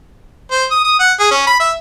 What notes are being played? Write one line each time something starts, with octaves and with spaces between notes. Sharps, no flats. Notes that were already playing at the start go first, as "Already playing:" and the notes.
C5
D#6
D#6
F#5
G#4
C#4
B5
E5